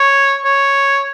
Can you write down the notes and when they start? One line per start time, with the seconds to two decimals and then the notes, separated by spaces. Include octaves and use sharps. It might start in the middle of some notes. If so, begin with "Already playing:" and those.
Already playing: C#5
0.45 C#5